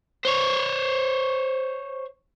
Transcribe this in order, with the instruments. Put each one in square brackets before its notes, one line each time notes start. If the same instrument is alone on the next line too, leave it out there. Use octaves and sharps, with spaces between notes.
[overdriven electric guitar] C5 C#5